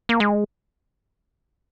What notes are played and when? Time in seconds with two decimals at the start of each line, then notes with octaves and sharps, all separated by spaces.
0.09 A#3
0.20 G#3